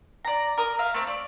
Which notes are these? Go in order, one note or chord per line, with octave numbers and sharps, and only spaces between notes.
D5 A#5
A#4 D#6
E5 F5
A3 C4
D5